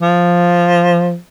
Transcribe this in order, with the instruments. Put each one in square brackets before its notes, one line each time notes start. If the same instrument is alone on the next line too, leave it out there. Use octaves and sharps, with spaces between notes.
[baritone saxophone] F3